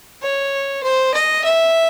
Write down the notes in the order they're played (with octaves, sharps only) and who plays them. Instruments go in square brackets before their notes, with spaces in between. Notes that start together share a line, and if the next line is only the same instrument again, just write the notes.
[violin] C#5
C5
D#5
E5